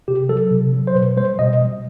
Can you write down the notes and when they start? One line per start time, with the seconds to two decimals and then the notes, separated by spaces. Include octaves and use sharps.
0.08 C3 G4
0.29 F#3 A4
0.51 C3
0.73 F#3
0.87 C5
0.95 B2 B4
1.17 G3 C5
1.39 B2 D#5
1.61 G3